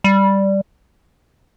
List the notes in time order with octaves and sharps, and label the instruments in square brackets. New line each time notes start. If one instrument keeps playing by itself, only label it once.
[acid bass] G3